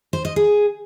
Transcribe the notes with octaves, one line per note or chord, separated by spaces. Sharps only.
C5
D#5
G#4